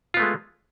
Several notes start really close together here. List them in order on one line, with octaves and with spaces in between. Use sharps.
F4 B3 A3 G#3